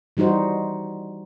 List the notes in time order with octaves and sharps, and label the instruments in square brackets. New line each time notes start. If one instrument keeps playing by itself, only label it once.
[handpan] E3 G3 D#4 F#4 C5